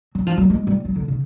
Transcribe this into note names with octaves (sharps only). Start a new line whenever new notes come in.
F#3
F3
F#3
G#3
G3
F#3
D3
C#3